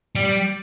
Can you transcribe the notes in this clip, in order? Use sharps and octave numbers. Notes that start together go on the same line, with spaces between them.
G3